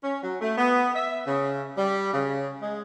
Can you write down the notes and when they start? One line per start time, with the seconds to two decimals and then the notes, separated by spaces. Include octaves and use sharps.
0.04 C#4
0.23 F#3
0.41 A3
0.58 B3
0.95 E5
1.26 C#3
1.76 G3
2.13 C#3
2.61 G#3